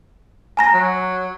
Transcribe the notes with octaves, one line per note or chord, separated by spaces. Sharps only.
G#5 A#5 A#6
F#3